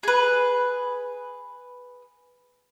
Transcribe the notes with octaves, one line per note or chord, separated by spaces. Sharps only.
G#4 B4